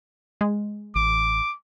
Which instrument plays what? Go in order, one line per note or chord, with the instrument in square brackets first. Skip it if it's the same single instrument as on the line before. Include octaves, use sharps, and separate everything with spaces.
[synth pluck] G#3
[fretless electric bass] A1 [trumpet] D6